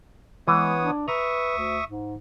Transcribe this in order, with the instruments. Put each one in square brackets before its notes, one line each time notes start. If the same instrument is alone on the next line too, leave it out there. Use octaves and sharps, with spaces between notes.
[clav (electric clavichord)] E3 [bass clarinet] G#3 [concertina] B3 C#5 D#6
[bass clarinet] D4
[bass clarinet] B4 [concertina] E5 C#6 D#6 [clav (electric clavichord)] A#5
[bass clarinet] D2
G#2